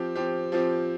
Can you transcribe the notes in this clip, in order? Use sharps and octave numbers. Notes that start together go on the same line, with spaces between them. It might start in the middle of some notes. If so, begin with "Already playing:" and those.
Already playing: F3 C4 G4
F3 C4 G4
F3 C4 G4